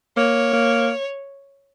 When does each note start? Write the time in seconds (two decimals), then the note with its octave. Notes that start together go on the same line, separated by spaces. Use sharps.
0.17 A#3 C#5
0.53 A#3